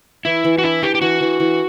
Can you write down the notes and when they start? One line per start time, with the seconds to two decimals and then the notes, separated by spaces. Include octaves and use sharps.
0.25 E3 E4
0.44 E3
0.58 F#4
0.64 D4 E4
0.82 E3 G4
0.95 G4
1.01 E3 F#4
1.21 E3
1.40 E3